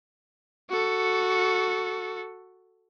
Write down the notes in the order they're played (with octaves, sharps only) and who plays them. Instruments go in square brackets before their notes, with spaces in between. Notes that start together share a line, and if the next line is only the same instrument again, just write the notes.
[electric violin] F#4 A4